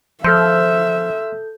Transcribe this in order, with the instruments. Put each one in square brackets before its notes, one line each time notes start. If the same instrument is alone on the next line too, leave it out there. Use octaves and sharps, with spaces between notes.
[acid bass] F3 [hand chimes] A4 G6 [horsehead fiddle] E5 [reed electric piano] C6 E6 F6